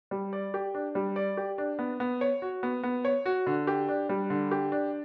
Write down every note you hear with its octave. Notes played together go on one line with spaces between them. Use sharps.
G3
D5
G4
D4
G3
D5
G4
D4
B3
B3
C#5
F#4
B3
B3
C#5
F#4
D3
G4
D4
G3
D3
G4
D4